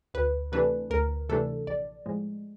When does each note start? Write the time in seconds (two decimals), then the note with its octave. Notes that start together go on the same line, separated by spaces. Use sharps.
0.14 D2 B4
0.52 C3 E3 A3 D4 B4
0.90 D2 A#4
1.29 C3 E3 A3 D4 A4
1.67 A#1 D5
2.06 A2 F3 G#3